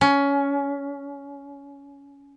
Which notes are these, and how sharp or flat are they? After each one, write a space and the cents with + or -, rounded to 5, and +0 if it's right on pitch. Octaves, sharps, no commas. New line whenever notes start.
C#4 +20